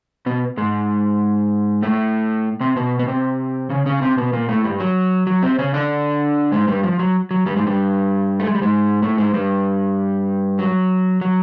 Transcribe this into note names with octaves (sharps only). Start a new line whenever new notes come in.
B2 B3
G#2 G#3
A2 A3
C3 C4
B2 B3
B3
C3 C4
C#3 C#4
C#3 C#4
C3 C4
B2 B3
A#2 A#3
A2 A3
G2 G3
F#3
F#3
C3 C4
C#3 C#4
D3 D4
G#2 G#3
G2 G3
F3
F#3
F#3
G2 G3
G#2 G#3
G2 G3
A3
G#3
G3
G#2 G#3
A2 A3
G#2 G#3
G2 G3
F#3
F#3